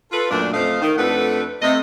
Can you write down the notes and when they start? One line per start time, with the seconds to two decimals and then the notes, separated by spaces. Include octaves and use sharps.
0.12 F4 A4 B4
0.31 F#2 A#2 A3 D4
0.54 F2 A3 C5 D#5 F5
0.82 D#3
0.98 F2 A3 D4 A4 B4 F#5
1.62 C3 A3 D#5